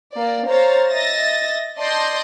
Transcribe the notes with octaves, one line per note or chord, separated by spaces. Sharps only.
A#3 D5
C5 C#5 F5 A#5 A6
D#5 E5 A6 A#6
D5 D#5 A5 C6 G6 A#6